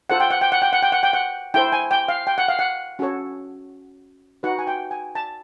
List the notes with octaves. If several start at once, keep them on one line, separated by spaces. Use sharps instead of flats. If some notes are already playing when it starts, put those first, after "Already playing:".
F4 A4 C5 F#5
G5
F#5
G5
F#5
G5
F#5
G5
F#5
G5
F#5
E4 A4 C5 G5
G#5
G5
F5
G5
F#5
F5
F#5
C#4 F#4 A4 C#5
D#4 F#4 B4 F#5
G#5
G5
G#5
A5